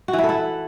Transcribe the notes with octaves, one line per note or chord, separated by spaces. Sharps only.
F#4
E3
E4
A4
E4